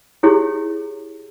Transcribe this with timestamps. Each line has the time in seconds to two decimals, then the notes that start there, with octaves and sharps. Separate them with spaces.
0.23 E4 G4 G#4 C#5